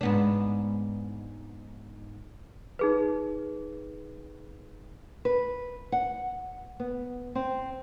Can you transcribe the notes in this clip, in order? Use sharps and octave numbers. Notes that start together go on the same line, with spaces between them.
G#2 B3 D4
D#4 G#4 B4
B4
F#5
B3
C4